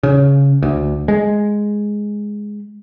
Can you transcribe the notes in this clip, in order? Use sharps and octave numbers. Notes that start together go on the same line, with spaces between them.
C#3
D2
G#3